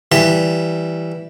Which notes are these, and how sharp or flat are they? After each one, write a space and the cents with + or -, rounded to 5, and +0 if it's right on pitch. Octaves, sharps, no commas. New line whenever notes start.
E3 +0 G3 +0 A5 +30